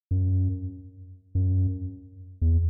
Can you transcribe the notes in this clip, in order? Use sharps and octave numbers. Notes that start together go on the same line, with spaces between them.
F#2
F#2
E2